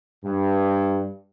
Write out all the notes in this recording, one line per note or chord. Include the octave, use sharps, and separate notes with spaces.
G2